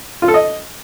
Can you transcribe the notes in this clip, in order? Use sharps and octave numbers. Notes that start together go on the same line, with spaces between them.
F4
A4
D#5